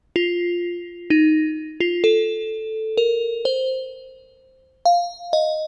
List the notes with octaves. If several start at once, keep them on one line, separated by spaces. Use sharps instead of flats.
F4
D#4
F4
A4
A#4
C5
F5
D#5